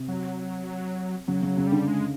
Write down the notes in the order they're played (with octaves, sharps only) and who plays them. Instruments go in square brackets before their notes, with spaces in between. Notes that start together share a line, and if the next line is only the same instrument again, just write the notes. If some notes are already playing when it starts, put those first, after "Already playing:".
Already playing: [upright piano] C3
[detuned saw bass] F#3
[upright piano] C#3 [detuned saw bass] F#3
[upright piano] C#3 [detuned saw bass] F#3
[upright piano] C#3
[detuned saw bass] G3
[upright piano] D3
[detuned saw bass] G#3